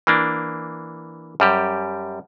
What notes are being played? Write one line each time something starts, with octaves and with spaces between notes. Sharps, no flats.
E3 A#3 D4
F#2 G3 G4